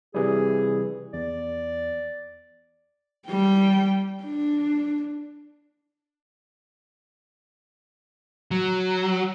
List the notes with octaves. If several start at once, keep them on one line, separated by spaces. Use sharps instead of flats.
C3 E3 G3 G#4
E2 D5
G3 G5
D4
F#3